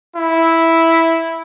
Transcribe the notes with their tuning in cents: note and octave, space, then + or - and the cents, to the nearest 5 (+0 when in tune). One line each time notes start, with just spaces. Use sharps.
E4 -5